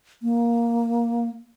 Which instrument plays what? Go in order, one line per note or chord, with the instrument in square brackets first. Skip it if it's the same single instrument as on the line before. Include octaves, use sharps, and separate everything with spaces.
[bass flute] A#3